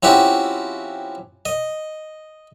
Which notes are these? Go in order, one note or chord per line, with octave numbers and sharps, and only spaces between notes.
F3 C4 C#4 E4 F#4 G4
D#5